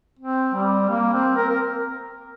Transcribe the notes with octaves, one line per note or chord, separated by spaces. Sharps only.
C4
G3
A#3
C4
A#4
A#4